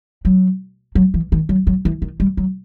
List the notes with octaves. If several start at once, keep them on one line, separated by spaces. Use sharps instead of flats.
F#3
F#3
E3
D#3
F#3
F#3
E3
D#3
G3
F#3